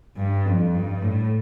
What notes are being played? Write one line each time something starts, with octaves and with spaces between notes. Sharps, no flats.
G2
F2
G2
A2